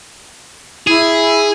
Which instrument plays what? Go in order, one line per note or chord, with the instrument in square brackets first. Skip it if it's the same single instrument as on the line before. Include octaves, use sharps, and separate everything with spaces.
[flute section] E4 [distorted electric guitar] G#4